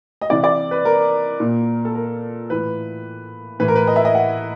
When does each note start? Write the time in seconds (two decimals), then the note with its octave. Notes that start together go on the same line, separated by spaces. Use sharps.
0.21 D#5
0.30 C3 E3 D5
0.44 D5
0.71 B4
0.85 A#4
1.40 A#2
1.85 A4
1.95 A#4
2.50 A2 E3 B4
3.60 A2 E3 B4
3.68 A#4
3.76 B4
3.87 D#5
3.96 E5
4.05 D#5
4.15 F#5